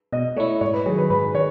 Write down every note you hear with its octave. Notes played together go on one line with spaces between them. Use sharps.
B2 D#5
A3 E4 C#5
G#2 C#5
B4
D#3 F#3 G#4
B4
G#2 B4
D#3 C#5